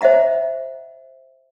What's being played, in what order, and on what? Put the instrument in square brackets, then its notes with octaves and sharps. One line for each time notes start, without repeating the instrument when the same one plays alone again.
[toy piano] C5 D#5 E5 F#5 A#5